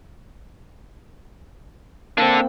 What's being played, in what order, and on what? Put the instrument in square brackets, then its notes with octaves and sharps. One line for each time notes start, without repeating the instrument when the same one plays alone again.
[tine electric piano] A#3 C4 [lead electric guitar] D4 A4